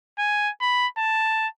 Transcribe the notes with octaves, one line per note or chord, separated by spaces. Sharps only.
G#5
B5
A5